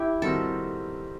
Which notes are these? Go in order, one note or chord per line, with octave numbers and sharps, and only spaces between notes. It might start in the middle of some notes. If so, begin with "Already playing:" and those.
Already playing: E4 G4
D#3 G3 C4 F#4 A4